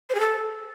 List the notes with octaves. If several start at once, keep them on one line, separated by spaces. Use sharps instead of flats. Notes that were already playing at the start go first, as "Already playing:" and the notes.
C5
G#4
A4